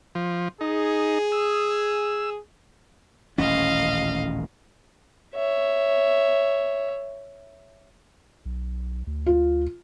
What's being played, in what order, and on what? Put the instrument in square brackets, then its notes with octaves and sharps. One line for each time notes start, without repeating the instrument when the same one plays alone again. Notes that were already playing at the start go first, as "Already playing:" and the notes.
[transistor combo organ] F3
[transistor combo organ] D#4 [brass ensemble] G#4
[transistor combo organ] E6
[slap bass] D#1 A1 C#4 [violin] D#5 F5
[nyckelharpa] C#5 E5
[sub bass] B1
D2
[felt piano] F4